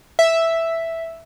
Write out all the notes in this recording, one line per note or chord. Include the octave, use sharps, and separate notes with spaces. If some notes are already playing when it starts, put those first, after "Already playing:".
E5